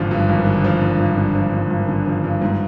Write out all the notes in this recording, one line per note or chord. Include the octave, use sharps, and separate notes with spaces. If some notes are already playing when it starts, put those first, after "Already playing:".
Already playing: G#1 D3 F3
G2
G#1
D3
F3
G2
G#1
D3
F3
G2
G#1
D3
F3
G2
G#2